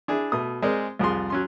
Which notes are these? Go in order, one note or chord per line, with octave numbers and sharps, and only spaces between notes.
D4 E4 G#4
B2 A3 D#6
G#3 C4 G#4 A#4 C5 D5
C2 F2 G#4 C6
F#3 C#4 C6